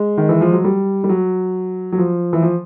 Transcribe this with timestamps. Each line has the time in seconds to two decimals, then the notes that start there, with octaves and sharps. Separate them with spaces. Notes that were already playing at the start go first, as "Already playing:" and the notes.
Already playing: G#3
0.18 D#3
0.29 E3
0.41 F3
0.53 F#3
0.64 G3
1.04 G3
1.09 F#3
1.92 F#3
1.98 F3
2.33 E3
2.42 F3